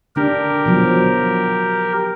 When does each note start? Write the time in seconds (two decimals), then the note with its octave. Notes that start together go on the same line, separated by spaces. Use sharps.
0.16 D3 D4 G4 A#4
0.65 B2 F3 F#3